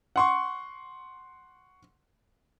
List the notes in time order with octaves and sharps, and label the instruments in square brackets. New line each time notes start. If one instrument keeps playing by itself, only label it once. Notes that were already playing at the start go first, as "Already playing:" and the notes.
[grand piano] F#5 C6 C#6